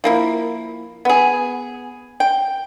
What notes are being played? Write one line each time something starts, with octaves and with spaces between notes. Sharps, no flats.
F3 A#3 E4
B3 G#4
G5